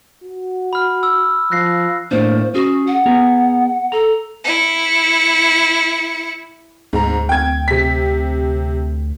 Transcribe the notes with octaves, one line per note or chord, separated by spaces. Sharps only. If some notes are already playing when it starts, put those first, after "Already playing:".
F#4
B5 F6
E6
F3 F#6 A#6 C7
A2 A#3 D4 C5
C#4 F#4 G#4
F#5
B3 G#4 A#5
A4 A#5
E4 C#7
D2 G#2 A#5
G5 G#6
C3 B6